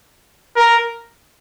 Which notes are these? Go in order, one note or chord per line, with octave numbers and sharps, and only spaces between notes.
A#4